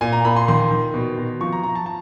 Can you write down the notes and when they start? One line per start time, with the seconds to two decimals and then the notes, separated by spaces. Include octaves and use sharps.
0.01 A#2 G#5
0.13 A#5
0.25 A#2 B5
0.36 C6
0.48 D#3 C6
0.71 D#3
0.94 B2
1.18 B2
1.41 F3 C#6
1.52 A#5
1.63 F3 A#5
1.75 A5
1.86 A5